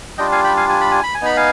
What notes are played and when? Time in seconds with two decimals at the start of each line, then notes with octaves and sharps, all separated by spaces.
0.18 G3 D4 F4 D#5 G5
0.32 F5 G#5
0.44 G5 B5
0.57 F5 G#5
0.69 G#5
0.81 B5
0.92 G#5
1.03 B5
1.15 G#5
1.21 B3 D#4 B5
1.37 F5 G#5